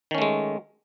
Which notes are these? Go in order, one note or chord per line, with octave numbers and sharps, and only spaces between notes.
D#3 G#3 A3 C#4